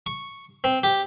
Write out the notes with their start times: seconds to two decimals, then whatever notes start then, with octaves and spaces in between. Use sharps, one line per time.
0.06 C#6
0.64 C4
0.83 G4